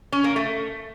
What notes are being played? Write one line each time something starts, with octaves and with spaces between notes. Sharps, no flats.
C#4
A#3
A3